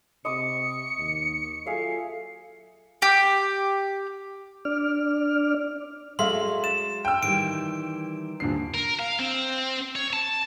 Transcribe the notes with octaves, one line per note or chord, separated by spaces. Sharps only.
C3 D#5 C#6 D6 C#7
D#2
F#3 F4 G#4 A4 E5 F5 C7
G4
D4 D5 F6
F#3 G#3 A3 E5 F5 C6
A6 E7
G5 E6
D#3 E3 G3 D7
D#1 D3 C7
A#4
F5
C4
C#5
A5